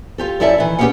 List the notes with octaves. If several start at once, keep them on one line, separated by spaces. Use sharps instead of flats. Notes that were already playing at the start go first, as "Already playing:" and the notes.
F4 G4 A4
F#2 E4 A4 D5 E5 A5
D#3 E3
B3 C#4 G4 G#4 F5 F#5